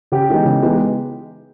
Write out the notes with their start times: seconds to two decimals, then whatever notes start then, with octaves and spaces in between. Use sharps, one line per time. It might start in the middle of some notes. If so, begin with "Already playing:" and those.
0.12 C#3 G4
0.29 E3 G#3 B3 D#4
0.45 C#3
0.62 E3 G#3 B3 D#4